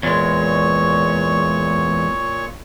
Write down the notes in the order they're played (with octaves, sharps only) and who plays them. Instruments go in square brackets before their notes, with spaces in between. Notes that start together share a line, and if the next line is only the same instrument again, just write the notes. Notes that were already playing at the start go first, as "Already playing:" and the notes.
[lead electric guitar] E2 G#3 [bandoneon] A#2 C#5 C#6